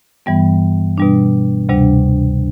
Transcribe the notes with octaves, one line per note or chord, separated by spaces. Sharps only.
G2 E3 G3 B3
B2 G3 D4
D2 C3 G3 D4